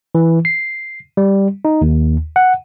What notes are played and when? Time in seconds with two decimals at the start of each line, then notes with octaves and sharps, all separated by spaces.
0.15 E3
0.45 C7
1.17 G3
1.65 D#4
1.81 D#2
2.36 F#5